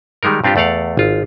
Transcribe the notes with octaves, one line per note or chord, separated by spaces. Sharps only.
D#3 G3 G#3 D#4 A#4
G2 C4 D4 F4 G4
E2 A3 D5 F5 F#5
G#1 F4